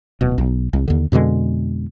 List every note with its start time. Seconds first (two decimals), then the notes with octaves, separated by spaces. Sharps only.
0.21 D1 B2
0.38 B1
0.73 C2
0.88 D#2 D3
1.12 F2 B2 D3 G#3